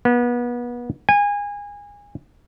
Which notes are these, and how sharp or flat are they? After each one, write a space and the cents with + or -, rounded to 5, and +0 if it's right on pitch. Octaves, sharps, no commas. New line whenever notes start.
B3 -30
G#5 -25